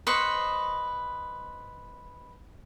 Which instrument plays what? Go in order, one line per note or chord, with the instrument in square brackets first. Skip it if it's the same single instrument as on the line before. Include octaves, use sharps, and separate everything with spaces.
[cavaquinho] B4 C5 D#5 C#6